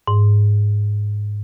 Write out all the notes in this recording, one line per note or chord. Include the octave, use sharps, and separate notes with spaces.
G#2